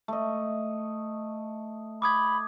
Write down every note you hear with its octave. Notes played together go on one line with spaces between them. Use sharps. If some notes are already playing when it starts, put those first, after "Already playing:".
A3 D#5
B5 D6 D#6 G#6